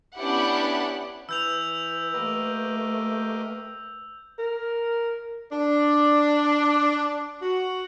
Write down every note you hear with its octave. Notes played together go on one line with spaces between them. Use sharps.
B3 C#4 D4 E4 G4 F#5
E3 B4 E6 G6 F7
A3 A#3 G4 D#5
A#4
D4
F#4